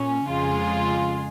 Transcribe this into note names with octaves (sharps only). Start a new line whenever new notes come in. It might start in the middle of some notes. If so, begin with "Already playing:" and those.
Already playing: A#2 C#4
F2 C#3 G#3 F4 G#4